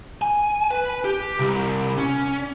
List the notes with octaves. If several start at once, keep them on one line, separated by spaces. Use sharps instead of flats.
G#5
B4
G4
C2
C#4